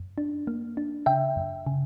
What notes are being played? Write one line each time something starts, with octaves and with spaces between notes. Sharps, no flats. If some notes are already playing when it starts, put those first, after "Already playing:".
Already playing: F#2
D4
A#3
D4
C#3 E5 G5
F#2
C#3